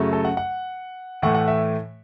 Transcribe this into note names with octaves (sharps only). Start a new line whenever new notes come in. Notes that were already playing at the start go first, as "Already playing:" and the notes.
Already playing: F#2 C#3 F#3 A3
A4
F#5
F#5
A2 E3 A3 F#5
F#5
E5